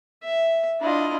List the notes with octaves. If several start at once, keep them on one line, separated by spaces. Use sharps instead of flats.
E5
D4 E4 F4 D#5